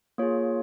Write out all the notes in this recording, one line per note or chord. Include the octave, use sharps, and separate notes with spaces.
A#3 F4 G#4 C#5